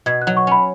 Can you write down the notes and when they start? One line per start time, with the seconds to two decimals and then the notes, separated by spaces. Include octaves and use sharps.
0.06 B2 G#6
0.22 F#6
0.27 F#3
0.37 C#6
0.47 C#4 B5